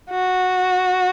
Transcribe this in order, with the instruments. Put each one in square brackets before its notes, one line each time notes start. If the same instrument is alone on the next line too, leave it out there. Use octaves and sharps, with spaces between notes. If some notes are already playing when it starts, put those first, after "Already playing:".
[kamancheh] F#4